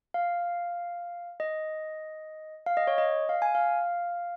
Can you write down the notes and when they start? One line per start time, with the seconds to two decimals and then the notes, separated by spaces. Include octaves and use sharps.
0.14 F5
1.40 D#5
2.66 F5
2.77 D#5
2.87 C#5
2.98 D#5
3.29 F5
3.42 G#5
3.55 F5